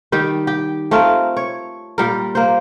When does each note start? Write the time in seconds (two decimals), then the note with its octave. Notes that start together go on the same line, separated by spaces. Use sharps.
0.12 D#3 G3 G4
0.47 G4
0.91 A3 C4 F4 A#4
1.37 C#5
1.98 A#2 G3 A#4
2.35 A#3 C5